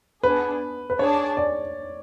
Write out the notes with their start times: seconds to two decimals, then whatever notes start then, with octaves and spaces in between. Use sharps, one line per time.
0.23 B3 D4 G#4 B4
0.90 B4
0.99 D4 G#4 C#5 D5 A5
1.37 D5